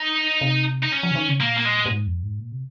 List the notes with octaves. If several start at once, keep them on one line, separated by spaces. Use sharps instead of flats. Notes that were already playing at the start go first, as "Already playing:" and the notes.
Already playing: D#4
C3
D#4
C#4
F3
C#3
D#3
C#3
A#2 A#3
A#3
G#3
A#2
G#2
F2
G#2
A#2
C3